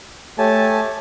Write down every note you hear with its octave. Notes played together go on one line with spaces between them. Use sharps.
A3 G4 C#5 G#5 A5